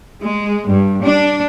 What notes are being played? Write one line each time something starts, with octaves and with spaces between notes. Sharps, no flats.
G#3
G2
D4